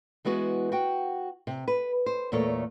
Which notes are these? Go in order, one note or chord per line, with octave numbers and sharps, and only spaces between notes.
E3 G#3 B3 F#4 G#4
F#4 F#5 G5
C3
B4
C5
E2 A#2 A3 A#3 C#5